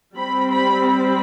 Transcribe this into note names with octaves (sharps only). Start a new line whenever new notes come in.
G3 C4 B5
B5
B5